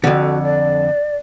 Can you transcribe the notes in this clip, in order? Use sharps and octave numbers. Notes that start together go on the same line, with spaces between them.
F2 D3 F#4
D5